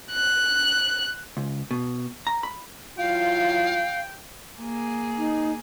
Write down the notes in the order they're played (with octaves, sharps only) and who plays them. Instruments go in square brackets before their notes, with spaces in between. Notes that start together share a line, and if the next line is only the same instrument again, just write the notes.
[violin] F#6
[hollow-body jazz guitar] C#2
B2
A#5
B5
[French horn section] F#3 E4 F4 [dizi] F5 [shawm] G5
[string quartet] A#3 G#4
[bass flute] D#4